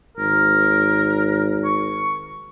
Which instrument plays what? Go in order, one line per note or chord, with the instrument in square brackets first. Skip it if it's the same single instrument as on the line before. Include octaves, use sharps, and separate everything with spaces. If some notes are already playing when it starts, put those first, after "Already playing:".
[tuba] G#1 [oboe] A#4
[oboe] C#6